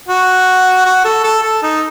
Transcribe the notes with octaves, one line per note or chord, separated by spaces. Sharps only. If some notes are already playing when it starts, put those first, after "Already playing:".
F#4
F#4
A4
A4
A4
D#4